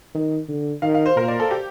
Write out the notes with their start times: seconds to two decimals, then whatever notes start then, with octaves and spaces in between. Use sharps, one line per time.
0.15 D#3
0.49 D3
0.82 D#3 F5
0.94 F5
1.06 C5
1.16 A#2 A#4
1.28 D5
1.40 A4
1.51 G4